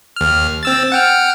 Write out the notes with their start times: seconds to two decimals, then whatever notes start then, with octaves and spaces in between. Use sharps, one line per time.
0.16 D#2 F6
0.63 C4 E6 A6
0.92 F#5 G5 F6